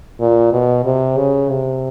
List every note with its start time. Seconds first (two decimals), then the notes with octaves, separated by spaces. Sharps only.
0.20 A#2
0.53 B2
0.85 C3
1.17 C#3
1.49 C3